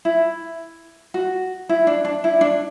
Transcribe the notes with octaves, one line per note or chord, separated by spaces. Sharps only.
E4
F#4
E4
D4
D4
E4
D4